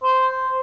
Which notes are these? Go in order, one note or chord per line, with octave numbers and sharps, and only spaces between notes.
C5